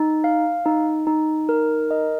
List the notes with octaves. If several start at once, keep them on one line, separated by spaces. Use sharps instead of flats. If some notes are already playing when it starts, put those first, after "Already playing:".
Already playing: D#4
F5
D#4
D#4
A#4
D#5